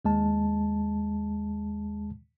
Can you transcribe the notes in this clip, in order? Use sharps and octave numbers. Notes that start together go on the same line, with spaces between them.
D#2 G#3 A5